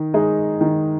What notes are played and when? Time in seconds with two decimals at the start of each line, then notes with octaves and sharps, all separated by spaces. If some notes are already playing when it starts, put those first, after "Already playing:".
Already playing: D#3
0.14 G#3 D#4 G#4 D#5
0.61 D#3